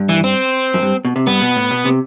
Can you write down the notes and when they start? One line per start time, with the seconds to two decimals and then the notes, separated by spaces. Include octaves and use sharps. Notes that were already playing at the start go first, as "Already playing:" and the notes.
Already playing: G2
0.09 E3
0.24 C4
0.74 F#2
0.82 G2
1.05 B2
1.16 C3
1.27 G2 B3
1.41 B2
1.56 A2
1.71 B2
1.85 C3